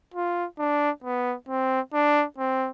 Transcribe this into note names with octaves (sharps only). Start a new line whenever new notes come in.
F4
D4
B3
C4
D4
C4